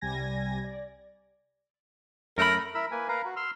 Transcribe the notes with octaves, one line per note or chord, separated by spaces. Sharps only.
C2 C3 G3 G#5 G#6 A#6
D5
F#2 A3 A#4 B5
E4 A#4 B5 E6
A#3 B4 G#5
A#4 B4 F5 A#5
F#4
C6 E6 F6